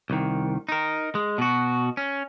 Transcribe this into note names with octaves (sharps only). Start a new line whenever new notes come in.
C2 D#3
D#4 A#4
G#3
B2 F#4
C#4